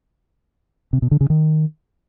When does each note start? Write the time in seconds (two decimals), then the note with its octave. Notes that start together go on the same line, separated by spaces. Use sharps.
0.93 C3
1.02 B2
1.11 D3
1.21 C#3
1.30 D#3